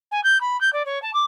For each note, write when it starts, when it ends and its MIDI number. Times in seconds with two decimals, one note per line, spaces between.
0.11 0.20 80
0.24 0.40 91
0.41 0.59 83
0.61 0.72 91
0.73 0.85 74
0.85 1.01 73
1.02 1.11 81
1.14 1.25 86